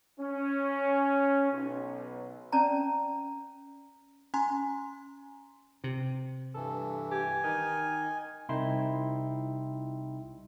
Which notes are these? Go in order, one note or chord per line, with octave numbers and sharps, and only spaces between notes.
C#4
B1
C#4 D5 A5 A#5
C#4 G#5 A#5 C6
C3
G2 E3 A4
G4 G#5
D#3 D#4 A#4
C2 D#4 E4 G5 C6